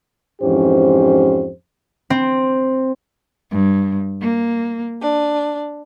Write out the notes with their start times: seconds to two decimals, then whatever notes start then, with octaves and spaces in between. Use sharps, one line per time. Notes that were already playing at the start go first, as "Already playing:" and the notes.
0.42 F2 G#2 E3 C#4 G4 C5
2.10 C4
3.50 G2
4.20 A#3
5.02 D4